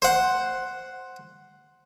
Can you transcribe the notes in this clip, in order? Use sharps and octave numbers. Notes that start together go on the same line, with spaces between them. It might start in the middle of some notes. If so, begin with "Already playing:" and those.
C5 F#5